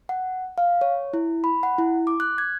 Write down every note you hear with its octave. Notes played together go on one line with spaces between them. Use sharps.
F#5
F5
C#5
E4
B5
F#5
E4
D6
F#6
G#6